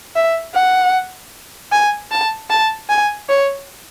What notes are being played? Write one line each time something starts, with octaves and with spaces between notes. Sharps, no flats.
E5
F#5
G#5
A5
A5
G#5
C#5